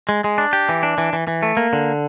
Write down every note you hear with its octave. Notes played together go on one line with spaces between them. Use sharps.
G#3
G#3
D4
G4
E3
D4
E3
E3
E3
A3
A#3
D3